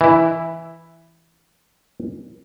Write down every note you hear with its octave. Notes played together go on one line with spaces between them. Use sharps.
E3 E4